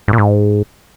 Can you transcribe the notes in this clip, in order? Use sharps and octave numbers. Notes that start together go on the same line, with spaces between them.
G#2
A#2
G#2